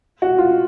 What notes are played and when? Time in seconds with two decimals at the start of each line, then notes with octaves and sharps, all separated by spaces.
0.22 F#4
0.38 F4